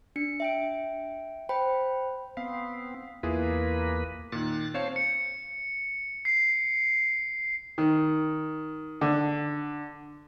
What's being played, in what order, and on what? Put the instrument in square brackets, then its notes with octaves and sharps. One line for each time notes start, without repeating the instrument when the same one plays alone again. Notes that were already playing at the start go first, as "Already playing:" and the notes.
[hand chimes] D4 C#7
E5 G5 D7
C5 G5 B5
[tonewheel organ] B3 C4 [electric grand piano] F5
[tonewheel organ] E2 A#3 B4 [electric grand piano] E4 F4 G#4
[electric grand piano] A#2 D#3 [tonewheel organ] F#6 A6
[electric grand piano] C4 C#5 F5 [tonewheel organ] C5 A5
[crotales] C#7
C7
[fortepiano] D#3
D3